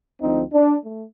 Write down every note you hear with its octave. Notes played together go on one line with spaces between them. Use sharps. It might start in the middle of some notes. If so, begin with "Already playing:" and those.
D2 D3 F3 C4 D#4
D4
A3